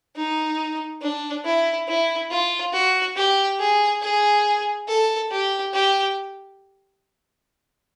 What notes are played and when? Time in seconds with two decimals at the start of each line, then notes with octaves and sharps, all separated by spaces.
0.16 D#4
1.02 D4
1.45 E4
1.87 E4
2.31 F4
2.73 F#4
3.16 G4
3.59 G#4
4.02 G#4
4.88 A4
5.31 G4
5.74 G4